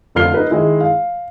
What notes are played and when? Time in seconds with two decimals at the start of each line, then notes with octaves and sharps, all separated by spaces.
0.15 F1 D3 F4 F6 C7 G7
0.34 D#4 A#4 B4
0.50 D#3 G#3 E4
0.81 F5